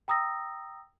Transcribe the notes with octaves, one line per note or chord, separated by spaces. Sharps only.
G5 A#5 D#6 E6 A#6